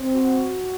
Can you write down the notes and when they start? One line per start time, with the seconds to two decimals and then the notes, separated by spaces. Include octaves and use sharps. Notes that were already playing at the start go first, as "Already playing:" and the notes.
Already playing: C4
0.12 F#4